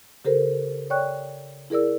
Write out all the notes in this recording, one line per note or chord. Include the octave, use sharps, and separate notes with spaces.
C#3 G4 A4 A#4 C5
C#5 D5 G5 C#6 F#6
E4 G#4 A#4 D5 E6